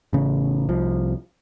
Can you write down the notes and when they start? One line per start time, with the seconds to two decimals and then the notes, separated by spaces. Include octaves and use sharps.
0.13 A1 C#3
0.69 C2 F3